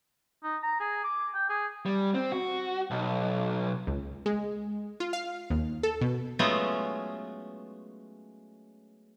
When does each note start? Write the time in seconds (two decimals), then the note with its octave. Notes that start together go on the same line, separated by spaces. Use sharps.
0.43 D#4
0.63 A#5
0.80 G#4
1.04 D6
1.34 G5
1.50 G#4
1.86 G3
2.14 C4
2.32 F#4
2.91 B1
3.87 C#2
4.26 G#3
5.00 F4
5.13 F5
5.50 D#2
5.83 A4
6.01 B2
6.39 F#3 G#3 A3 B3 C#4 F4